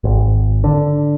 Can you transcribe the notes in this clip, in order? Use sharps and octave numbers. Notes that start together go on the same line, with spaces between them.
G#1
D3